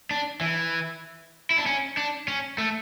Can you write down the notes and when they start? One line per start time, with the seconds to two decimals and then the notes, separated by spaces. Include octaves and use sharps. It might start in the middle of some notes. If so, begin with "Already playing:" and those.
0.11 D4
0.41 E3
1.50 E4
1.58 D4
1.66 C#4
1.97 D4
2.28 C#4
2.58 A3